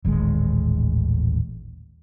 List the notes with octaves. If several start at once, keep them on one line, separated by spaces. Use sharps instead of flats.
D#1 A1 D#3 G#3